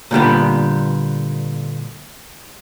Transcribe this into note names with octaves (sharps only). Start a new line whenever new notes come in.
A#2 D3 G3 B3